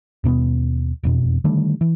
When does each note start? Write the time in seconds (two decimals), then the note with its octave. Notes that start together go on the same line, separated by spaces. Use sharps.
0.24 D#2 B2 A#3 B3
1.03 E1 F2 B2
1.44 D3 D#3 G3 A3
1.81 E3